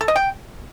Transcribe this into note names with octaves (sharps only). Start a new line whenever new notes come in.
A4
D#5
G5